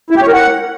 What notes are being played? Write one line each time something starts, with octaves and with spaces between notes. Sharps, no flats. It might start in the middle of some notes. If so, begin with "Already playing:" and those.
E4
G4
C#5
A#4
F#5